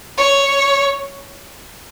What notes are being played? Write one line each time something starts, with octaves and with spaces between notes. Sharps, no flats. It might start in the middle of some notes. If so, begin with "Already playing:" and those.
C#5